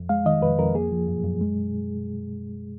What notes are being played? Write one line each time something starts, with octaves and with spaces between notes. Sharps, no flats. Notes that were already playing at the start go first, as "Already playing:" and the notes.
Already playing: F2
G#3 F5
D#3 D#5
F2 B4
F2 A#4
A#3 G#4
F3
F#2
F#2
G#3